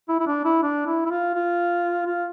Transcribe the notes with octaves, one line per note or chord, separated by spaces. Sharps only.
E4
E4
D4
E4
D4
E4
E4
F4
F4
F4